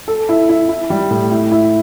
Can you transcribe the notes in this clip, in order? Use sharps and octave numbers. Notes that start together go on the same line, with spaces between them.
A4
E4
E4
E4
G3
A2
E4
E4